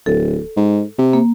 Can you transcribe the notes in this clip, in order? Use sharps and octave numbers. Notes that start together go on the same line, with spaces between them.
D1 A4
G#2
C3
A#3